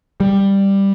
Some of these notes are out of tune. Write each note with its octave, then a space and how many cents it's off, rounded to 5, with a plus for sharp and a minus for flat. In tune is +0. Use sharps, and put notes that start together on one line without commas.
G3 +5